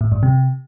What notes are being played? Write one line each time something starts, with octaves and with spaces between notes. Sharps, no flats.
A2
G2
C3